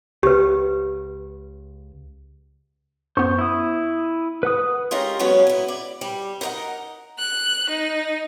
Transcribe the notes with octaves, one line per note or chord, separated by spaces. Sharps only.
C#2 G4 B4
F#2 B3 C5 C#6
E4 D#6
B4 F#5 D#6
G#3 C#4 F4 G4 A#4 D#5
F#3 G#3 B3 C#4 C#5
B3 E4
D5
G3
D#4 A#4 B4 D#5 F#5
F#6
D#4